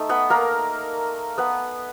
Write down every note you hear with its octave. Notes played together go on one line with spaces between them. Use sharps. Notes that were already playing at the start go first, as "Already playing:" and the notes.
Already playing: A3 D#4
B3 B4
A#3 A#4
B3 B4